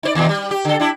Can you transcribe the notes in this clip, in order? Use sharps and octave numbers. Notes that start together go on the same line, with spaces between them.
D#4 C5 D5
D#2 B2
G3
G4
D3 A4
D4 E4